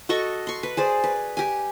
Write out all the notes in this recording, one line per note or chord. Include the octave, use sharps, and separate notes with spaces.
F#4 A4 D#5 C#6
C6 C#6
B4
G#4 C5 D5
B4
G4 G#5